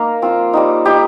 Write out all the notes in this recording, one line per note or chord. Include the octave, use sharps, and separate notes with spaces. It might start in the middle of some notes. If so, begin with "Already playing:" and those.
Already playing: A#3 D#4 A#4 F5
F3 C4 F4
G3 C4 D#4
G3 D#4 G4